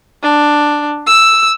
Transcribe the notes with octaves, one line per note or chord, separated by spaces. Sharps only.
D4
E6